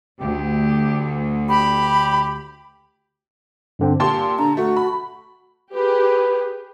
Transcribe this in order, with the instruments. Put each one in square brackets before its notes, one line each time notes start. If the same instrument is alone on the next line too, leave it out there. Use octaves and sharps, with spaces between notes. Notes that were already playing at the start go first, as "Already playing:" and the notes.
[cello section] D2 [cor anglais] G4
[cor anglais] G4 [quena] B5
[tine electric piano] G2 D3 C4
[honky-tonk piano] A#2 G4 C6 [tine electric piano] A5
[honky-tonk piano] D3 [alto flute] A#5
[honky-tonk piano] A3 [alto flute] F#4
[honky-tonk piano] B5
[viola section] G4 G#4 [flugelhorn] B4